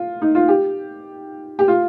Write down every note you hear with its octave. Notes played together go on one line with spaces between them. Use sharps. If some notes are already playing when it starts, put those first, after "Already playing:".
Already playing: F4
D#4
F4
G4
G4
F4